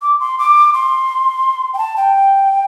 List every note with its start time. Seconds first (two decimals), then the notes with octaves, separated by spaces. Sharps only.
0.02 D6
0.20 C6
0.39 D6
0.74 C6
1.74 G5
1.78 A5
1.97 G5